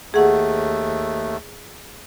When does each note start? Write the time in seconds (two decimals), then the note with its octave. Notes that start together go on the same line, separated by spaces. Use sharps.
0.14 D#2 A3 G#4 F#5